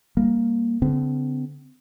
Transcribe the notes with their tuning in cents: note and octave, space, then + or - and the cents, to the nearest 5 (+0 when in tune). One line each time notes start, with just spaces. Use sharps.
G3 +25 A#3 +0
D3 -40 C4 -45